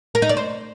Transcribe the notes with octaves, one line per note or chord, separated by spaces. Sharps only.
A#4
D#4
D5
C5